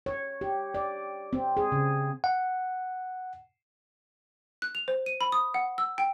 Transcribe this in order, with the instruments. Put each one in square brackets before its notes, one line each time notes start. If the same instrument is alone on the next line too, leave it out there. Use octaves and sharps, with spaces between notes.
[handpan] C#5
G4
D5
C4
G#4
C#3
[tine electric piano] F#5
[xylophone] F#6
F7
C5
D#7
B5
D#6
F#5
E6
G5